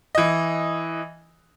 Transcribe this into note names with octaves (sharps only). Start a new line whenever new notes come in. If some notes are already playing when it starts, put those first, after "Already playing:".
E3 D#5